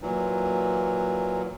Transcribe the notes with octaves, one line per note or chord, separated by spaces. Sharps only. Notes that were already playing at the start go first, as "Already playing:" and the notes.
A#2 E3 F#3